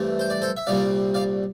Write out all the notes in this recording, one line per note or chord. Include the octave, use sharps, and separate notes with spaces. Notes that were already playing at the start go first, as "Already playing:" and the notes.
Already playing: G2 E3 A3 C4
C5
D5
A4 C5
E5
C2 A#2 G3 C4 D5 F5
D5 F5